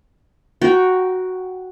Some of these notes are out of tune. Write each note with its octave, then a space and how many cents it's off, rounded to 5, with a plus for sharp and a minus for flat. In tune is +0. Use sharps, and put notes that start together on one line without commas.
F#4 +0 G5 -15 A#5 +15